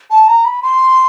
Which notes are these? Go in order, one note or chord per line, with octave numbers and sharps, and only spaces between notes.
A5
A#5
B5
C6